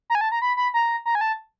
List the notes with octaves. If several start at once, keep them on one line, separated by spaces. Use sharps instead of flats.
A#5
G#5
A5
A#5
B5
B5
A#5
A#5
G#5
A5